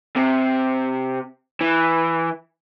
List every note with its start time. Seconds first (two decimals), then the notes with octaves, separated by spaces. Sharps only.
0.17 C3
1.61 E3